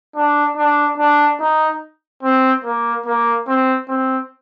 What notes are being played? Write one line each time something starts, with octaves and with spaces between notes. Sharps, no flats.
D4
D4
D4
D#4
C4
A#3
A#3
C4
C4